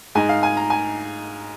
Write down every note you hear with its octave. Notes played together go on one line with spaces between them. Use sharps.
G#2 G#3 D#4 G#5
F5
G#5
A#5
G#5